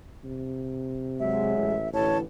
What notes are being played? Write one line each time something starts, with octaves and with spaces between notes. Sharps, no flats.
C3
F#3 G#3 E5
A1
A1 A2 D3 E3 C#5 A5